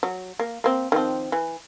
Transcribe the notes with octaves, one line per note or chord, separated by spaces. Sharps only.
F#3
A#3
A#3 C4
D#3 F3 C4
E3